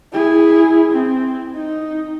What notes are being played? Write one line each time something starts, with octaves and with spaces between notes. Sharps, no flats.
E4 G#4
C4
D#4